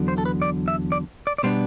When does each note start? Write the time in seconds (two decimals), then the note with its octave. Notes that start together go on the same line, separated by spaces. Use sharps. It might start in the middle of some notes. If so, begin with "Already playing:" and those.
Already playing: E2 D3 F#3
0.08 C5
0.18 A4
0.25 B4
0.42 D5
0.68 E5
0.92 D5
1.27 D5
1.38 D5
1.43 B2 G3 B3 D4 C5